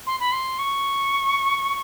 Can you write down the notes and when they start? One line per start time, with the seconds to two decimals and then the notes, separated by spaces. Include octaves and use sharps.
0.07 C6
0.20 B5
0.32 C6
0.59 C#6